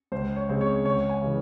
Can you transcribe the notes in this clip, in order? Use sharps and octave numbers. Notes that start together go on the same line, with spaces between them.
C#2 C5
C#5
C#3 G#3 C4
C#5
C#2 C#5
G#5
C#3 E3